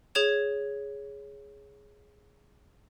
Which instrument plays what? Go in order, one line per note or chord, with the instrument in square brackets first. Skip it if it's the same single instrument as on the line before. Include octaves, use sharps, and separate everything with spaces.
[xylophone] G#4 C#5 G#6 E7